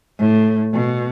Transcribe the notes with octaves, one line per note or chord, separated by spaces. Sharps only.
A2
B2